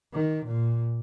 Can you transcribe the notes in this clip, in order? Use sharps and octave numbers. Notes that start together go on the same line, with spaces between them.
D#3
A#2